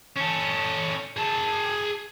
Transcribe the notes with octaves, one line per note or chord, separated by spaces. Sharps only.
C#4 A4
G#4 A5